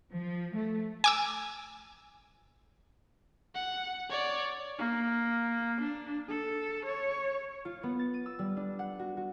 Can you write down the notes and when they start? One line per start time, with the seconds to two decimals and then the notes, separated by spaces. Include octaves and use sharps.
0.13 F3
0.56 A3
1.04 G#5 D6 E6
3.55 F#5
4.10 C#5 D5
4.78 A#3
5.80 D4
6.29 A4
6.86 C#5
7.65 F4
7.83 B3
7.99 A6
8.14 D#7
8.26 E6
8.39 G3
8.57 D4
8.79 F#5
8.99 F#4
9.17 F#4